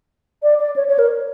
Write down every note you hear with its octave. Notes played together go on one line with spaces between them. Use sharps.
D5
D5
C#5
C#5
A#4